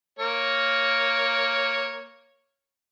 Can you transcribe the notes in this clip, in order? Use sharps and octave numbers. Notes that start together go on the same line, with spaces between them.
A#3 A#4 C#5